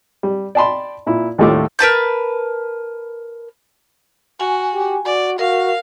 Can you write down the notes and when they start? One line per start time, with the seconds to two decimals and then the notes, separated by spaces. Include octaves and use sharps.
0.23 G3
0.55 D5 G5 A5 B5 C6
1.06 A#2 E4
1.38 D#2 A2 G3 A3 F4 D6
1.79 A#4 B4 A5 G6
4.40 F#4 G#5
4.74 G4
5.05 F#4 D5
5.39 F#4 A#4 F5